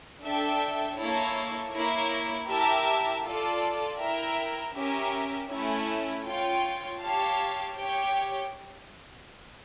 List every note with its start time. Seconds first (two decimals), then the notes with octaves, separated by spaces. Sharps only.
0.22 D4 A4 E5 G5
0.98 A#3 E4 A4 C#5
1.74 A#3 E4 A#4 C#5
2.49 E4 G4 A#4 E5 A5
3.24 F4 A4 D5
3.99 E4 A#4 E5 G5
4.75 C#4 G4 A#4 E5
5.51 A3 C#4 E4
6.25 F4 C#5 G5
7.01 G4 C#5 F5 A5
7.77 G4 C#5 G5